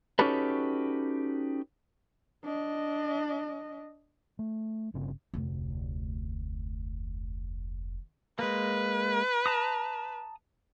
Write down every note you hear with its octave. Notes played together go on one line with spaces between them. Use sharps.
C#4 D#4 F#4 G4 A4 B4
D4 D#5
A3
G1 C#3 C4
F1 D2
G#3 A#3 B4
A5 A#5 D#6